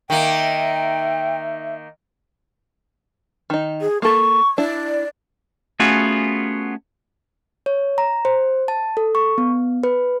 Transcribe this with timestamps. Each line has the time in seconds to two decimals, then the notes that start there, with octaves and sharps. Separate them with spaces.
0.10 D#3 A#3 E5 G5
3.50 D#3 D#4
3.81 G#4
4.02 A#3 A4 C#6
4.58 D4 E4 D5
5.80 A3 B3 C#4 F4 F#4 G#4
7.66 C#5
7.98 A#5
8.25 C5
8.68 A5
8.97 A4
9.15 C#6
9.38 B3
9.84 B4